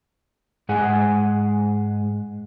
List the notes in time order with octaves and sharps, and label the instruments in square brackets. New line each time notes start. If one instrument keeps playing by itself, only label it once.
[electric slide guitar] G#2 G#3 G#4 F#5 G#5